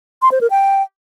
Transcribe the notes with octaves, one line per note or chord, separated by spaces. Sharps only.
C6
C5
A#4
G5